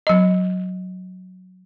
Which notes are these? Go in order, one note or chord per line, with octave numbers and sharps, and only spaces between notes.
F#3 D#5